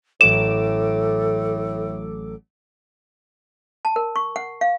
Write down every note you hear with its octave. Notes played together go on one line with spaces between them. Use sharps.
A1 A2 F#3 A4 D6 E7
A5
A#4
C#6
F#5
F5